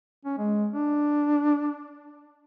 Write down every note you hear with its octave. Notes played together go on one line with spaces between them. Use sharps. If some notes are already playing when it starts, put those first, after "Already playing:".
C#4
G#3
D4